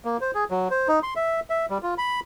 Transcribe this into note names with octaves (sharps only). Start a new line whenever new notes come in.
A#3
C5
G#4
F#3
C5
D#4
C6
E5
E5
G3
F4
B5